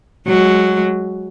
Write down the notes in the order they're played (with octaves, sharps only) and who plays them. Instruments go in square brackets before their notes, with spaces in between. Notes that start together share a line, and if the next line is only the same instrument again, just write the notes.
[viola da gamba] F#3 G#3